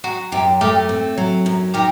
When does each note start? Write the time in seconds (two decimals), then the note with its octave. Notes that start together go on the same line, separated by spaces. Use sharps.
0.04 F#3 F#4
0.32 F#2 G4
0.61 A3 G4 A#4
0.89 C4
1.18 F#3
1.46 F#2
1.74 D#3 G4 A#4